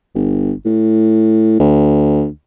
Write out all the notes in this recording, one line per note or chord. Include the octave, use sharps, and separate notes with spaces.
G1
A2
D2